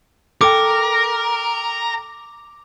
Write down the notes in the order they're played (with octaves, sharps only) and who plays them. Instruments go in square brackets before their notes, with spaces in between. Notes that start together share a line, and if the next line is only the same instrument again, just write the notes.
[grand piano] A4 G5 [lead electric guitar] A#4 [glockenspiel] D6